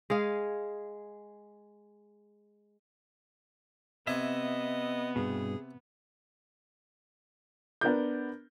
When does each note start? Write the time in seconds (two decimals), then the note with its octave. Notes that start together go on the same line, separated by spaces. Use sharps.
0.10 G#3 G#4 F5
4.07 C3 B3 D#5 E5 G#5
5.16 G2 B2 G#4
7.81 B3 D4 A#4 G6